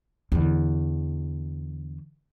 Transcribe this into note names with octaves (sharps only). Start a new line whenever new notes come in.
E2 D3